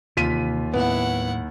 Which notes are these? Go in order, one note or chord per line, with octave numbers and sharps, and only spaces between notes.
D#2 C3 E3 A#3 F4 B6 D#7
A2 F#3 B3 E4 F#5